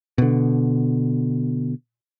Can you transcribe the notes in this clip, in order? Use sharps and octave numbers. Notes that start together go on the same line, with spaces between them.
B2 D3